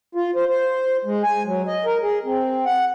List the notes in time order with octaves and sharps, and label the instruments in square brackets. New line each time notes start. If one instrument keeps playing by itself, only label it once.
[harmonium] F4
C5
C5
G#3
G#5
F#3
D#5
A#4
G#4
C4
F#5